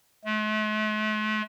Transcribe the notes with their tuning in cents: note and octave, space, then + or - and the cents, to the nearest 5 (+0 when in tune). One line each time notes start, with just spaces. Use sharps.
A3 -45